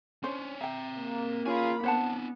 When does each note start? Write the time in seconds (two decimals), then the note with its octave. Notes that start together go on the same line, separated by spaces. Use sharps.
0.23 C#4 D4 C5 C#5
0.61 C4 E5 G5 A#5
0.99 A#3
1.46 C#4 F4 G#4 G#5 B5
1.84 B3 C4 D4 C5 F#5 A5